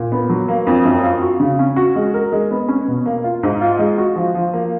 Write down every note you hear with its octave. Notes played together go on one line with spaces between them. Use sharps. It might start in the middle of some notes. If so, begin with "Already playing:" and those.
Already playing: A#2
B3
F#3
A#3
F2
F#2
F4
F#4
C#3
C#4
F#4
G#3
A#4
G#3
B3
C#4
B2
A#3
F4
G#2
F4
G#3
F#4
F3
F3
A#3